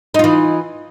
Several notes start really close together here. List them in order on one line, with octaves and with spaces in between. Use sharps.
D#4 F4 E3